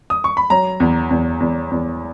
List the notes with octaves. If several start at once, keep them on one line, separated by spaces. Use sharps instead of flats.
D#6
C#6
B5
F#3 A#5
E2
E2
E2
E2